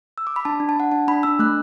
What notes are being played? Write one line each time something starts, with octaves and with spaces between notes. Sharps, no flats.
E6
D6
B5
D4 A5
D4
A5
D4 F#5
D4 A5
D4 B5
D4 E6
A3 F#6